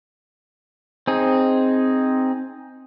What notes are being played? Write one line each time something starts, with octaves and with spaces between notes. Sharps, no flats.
C4 D#4 G#4